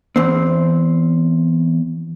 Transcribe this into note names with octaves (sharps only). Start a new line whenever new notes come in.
E2 C4